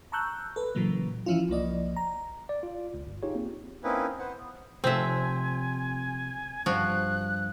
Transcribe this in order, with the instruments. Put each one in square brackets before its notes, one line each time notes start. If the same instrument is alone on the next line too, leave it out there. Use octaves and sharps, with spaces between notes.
[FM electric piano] A5 A#5 C#6 E6 F#6 G6
A4 B4
A#2 C#3 E3 F#3 A#3
E3 F3 C#4 E4 F4
C2 F3 A#3 D5 D#5
A#5
[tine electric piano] D5
F4
C#2
G1
D#4 F4 G4 G#4 C#5
A#3 C4
[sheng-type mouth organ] A#3 C4 C#4 D#4 E4 B4
B4 C5 F#5
B3
[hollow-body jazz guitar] C3 F3 A3 [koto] C4 E5 [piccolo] G#5
[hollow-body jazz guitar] G2 [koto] F3 F4 F#4 [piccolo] F#6